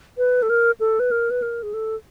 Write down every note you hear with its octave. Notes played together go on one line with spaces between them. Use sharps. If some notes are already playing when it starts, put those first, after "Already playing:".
B4
A4
A#4
A4
B4
A#4
B4
A#4
G#4
A4